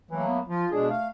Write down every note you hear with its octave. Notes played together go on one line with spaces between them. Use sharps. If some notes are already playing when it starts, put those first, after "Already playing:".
E3 F#3 A3 A#3
B3
F3 F4
B2 G#3 D4 G#4
A3 F5